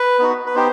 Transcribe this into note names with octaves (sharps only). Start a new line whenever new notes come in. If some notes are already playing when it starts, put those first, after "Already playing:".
Already playing: B4
B3 D#4 F#4
B4
B3 D#4 G4 C5